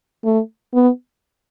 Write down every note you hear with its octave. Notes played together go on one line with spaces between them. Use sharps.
A3
B3